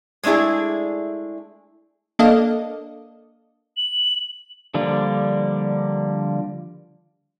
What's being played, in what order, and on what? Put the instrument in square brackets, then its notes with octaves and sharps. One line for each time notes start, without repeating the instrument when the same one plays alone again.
[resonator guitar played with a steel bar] G#3 A3 D4 E4 G#4
[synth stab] A#3 D4 A4 D#5 F5
[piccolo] F#7
[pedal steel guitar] D3 F3 G3 A#3 D4